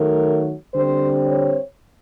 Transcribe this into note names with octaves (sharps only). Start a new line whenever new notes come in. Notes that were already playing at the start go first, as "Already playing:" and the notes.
Already playing: D#3 F#3 A3 A#4
D3 G3 C4 C5
C#5